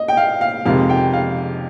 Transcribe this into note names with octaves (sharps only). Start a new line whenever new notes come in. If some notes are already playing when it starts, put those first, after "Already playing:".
Already playing: D#5
G5
F5
F5
F2 C3 D#3 G#3 F5
G5
F5